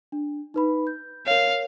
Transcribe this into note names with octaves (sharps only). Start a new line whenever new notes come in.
D4
D#4 B4 B5
G6
A#4 C#5 F5